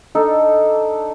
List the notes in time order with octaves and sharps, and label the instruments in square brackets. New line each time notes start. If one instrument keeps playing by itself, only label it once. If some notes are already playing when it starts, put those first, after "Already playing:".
[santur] D4 D#4 A4